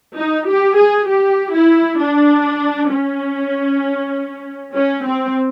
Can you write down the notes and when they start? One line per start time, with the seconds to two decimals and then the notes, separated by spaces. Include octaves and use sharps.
0.17 D#4
0.47 G4
0.77 G#4
1.08 G4
1.54 E4
2.00 D4
2.90 C#4
4.74 C#4
5.04 C4